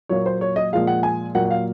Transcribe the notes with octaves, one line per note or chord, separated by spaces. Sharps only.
A#2 F#3 A#3 C#5
C5
C#5
D#5
A#2 F3 G#3 F5
F#5
G#5
A#2 F#3 A#3 F#5
F#5
F5